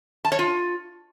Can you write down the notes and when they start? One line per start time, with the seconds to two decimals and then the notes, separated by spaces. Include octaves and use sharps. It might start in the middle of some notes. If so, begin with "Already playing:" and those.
0.25 A5
0.32 C#5
0.39 F4